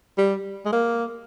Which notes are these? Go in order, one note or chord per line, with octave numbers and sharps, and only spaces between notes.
G3
G#3
A#3